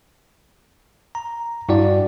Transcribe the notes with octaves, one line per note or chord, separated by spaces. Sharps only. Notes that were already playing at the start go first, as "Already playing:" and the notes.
A#5
G2 E4 F#4 D5